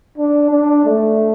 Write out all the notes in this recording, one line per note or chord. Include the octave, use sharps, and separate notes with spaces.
D4
D4
A3